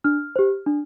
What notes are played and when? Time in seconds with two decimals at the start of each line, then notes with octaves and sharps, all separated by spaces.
0.04 D4 F6
0.36 G4 C5
0.66 D4